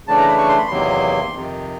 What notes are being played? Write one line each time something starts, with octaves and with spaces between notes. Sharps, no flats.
C#3 E3 A3 D4 A5
A#5
B5
C#6
C6
B5
E2 C3 D#3 F#3 A#3 C6
F2 C3 D#3